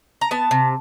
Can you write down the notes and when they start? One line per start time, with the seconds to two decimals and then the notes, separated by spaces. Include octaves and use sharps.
0.21 A#5
0.31 B3 A5
0.51 C3